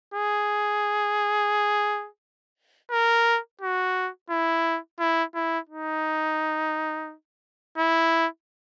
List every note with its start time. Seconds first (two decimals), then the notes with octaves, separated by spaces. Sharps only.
0.14 G#4
2.91 A#4
3.61 F#4
4.30 E4
4.99 E4
5.34 E4
5.69 D#4
7.78 E4